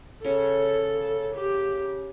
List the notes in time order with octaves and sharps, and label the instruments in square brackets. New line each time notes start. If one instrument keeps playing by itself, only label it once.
[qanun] C#3 [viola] A4
[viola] G4